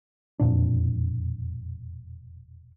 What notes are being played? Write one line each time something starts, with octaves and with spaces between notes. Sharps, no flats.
E1 F2 A#2 D4